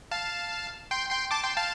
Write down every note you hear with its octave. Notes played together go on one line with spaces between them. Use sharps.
F5 A5
G5 C6
G5 C6
A5 D6
G5 C6
F5 A5